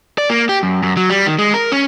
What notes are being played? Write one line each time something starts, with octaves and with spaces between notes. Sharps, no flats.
D5
A#3
G4
F#2
F#2
F#3
G3
D#3
G#3
A#4
C#4